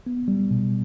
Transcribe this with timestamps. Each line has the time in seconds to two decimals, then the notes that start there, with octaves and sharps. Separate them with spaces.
0.06 B3
0.28 G3
0.51 B2